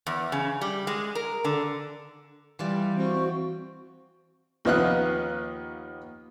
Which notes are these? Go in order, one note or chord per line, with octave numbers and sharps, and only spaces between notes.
E2
C#3
G3
G#3
A#4
D3
E3 G3 F4 D5
C4 F#4
D#2 F3 B3 D#5 F5 F#6